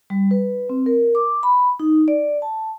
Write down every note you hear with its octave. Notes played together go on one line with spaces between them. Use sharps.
G3
B4
C4
A#4
D6
B5
D#4
D5
A5